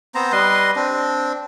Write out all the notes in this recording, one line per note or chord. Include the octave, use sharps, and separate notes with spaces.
B3 C4 C5 A#5
G3 B4 D#5 C6
C4 D4